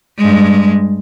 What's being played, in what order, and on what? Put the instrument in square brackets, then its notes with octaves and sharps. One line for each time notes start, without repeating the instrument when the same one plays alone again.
[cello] G2 G#3